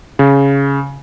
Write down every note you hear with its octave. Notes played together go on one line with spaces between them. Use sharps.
C#3